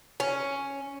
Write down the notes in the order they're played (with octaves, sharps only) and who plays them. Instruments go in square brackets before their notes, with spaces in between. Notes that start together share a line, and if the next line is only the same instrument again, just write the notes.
[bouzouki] C#4